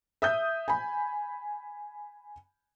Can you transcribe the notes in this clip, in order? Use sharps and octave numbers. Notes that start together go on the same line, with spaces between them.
E5 D#6 G6
G#5 B5